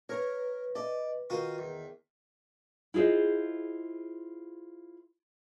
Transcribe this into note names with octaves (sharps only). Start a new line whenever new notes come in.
A#4 B4 C#5
D5 D#5
D#3 F4 F#4 D#6
E2
E4 F4 G#4 C5 D#5